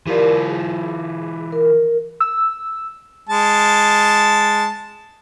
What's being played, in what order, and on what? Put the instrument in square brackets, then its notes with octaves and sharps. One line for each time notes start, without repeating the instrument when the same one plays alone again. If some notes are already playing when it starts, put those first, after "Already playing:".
[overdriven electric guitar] E3 F4 [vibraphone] G4 A#4 D5
[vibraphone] G#4
A#4
[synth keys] E6
[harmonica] G#3 A5